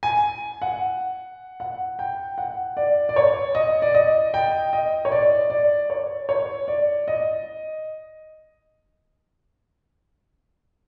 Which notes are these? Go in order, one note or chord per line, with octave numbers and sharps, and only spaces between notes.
G#5
F#5
F#5
G5
F#5
D5
D5
C#5
D#5
D5
D#5
G5
D#5
C#5
D5
D5
C#5
C#5
D5
D#5